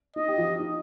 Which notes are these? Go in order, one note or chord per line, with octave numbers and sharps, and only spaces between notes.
D#4 D#5
G4
F3 F4
D#4